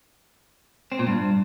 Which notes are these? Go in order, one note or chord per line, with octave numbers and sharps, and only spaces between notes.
C4
A#2
G2